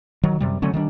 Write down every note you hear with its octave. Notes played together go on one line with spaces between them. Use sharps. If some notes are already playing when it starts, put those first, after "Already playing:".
D#3 F#3
F#2 C3 G3
D3 F#3 A3 C#4
D#3 G3 B3 D4